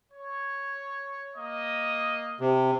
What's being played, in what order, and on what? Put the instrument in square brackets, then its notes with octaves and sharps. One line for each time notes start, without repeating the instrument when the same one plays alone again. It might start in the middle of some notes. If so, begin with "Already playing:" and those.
[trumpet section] C#5
A#3 D#5
[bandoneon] C3